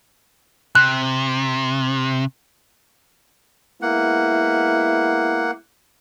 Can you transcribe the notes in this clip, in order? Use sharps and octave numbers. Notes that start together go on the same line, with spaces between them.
C3 F#6
G#3 A#3 B3 E4 F#5